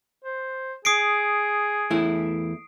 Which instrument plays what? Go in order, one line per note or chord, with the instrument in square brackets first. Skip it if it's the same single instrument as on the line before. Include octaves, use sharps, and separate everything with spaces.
[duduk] C5
[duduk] G#4 [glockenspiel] D#6 C7 D7
[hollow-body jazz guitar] E2 A3 E4